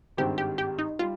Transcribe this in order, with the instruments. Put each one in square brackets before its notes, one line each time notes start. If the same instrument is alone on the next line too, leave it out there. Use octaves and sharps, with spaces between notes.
[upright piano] G#1 G2 D#3 G#3 C4 [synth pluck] G4
[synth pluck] G4
G4
D#4
[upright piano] G3 [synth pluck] F4